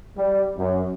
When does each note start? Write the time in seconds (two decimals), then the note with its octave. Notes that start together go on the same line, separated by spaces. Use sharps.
0.17 G3
0.57 F#2